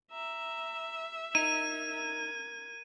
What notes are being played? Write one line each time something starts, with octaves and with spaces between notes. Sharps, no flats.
E5 A#5
D#4 A#4 G#6 D#7